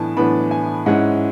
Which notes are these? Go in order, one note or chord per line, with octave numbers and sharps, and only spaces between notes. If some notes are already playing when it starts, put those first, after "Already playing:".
Already playing: A2 E3 B3 D4 G#5 A5
A2 E3 B3 D4 B5
G#5
G#2 G#3 C#4 E4 F#5